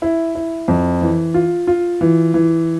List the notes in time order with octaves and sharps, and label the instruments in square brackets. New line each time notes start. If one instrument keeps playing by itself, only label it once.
[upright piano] E4
E4
F2
E3
F4
F4
E3
E3